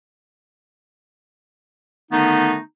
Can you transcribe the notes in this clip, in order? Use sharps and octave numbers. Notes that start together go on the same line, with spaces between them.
D3 D#3 A3 B3 D#4